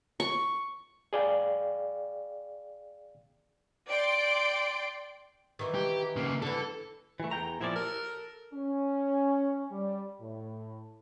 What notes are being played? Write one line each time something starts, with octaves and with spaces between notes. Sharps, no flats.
C#6
G#4 D5 F5 G5
D5 G5 C6 D7
D#3 E3
G4
C#3 A#3
D3 E3 A4
E3 A3
E2 G5 A#5
A#2 F3 E4 D5
A4 A#4
C#4
G3
A2